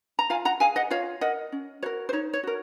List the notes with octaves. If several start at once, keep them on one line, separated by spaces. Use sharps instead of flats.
A#5
F4 F5 G#5
F#5 A#5
G#4 F5 G#5
D#5 F#5
F4 C#5 F5
A#4 D#5 F#5
C#4
F#4 A#4 C#5
C5
D#4 C#5
C#5
F#4 A#4